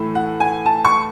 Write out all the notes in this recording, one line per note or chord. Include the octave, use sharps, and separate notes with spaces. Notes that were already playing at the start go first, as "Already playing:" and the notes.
Already playing: A2 E3 A3
F#5
G#5
A5
C#6